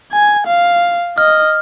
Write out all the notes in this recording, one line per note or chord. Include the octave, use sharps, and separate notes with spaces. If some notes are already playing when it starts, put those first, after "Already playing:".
G#5
F5
D#5 F6